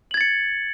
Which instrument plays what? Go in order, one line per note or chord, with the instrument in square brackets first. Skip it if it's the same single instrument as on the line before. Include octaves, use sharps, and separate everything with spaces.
[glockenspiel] F#7
G#6
A6
C#7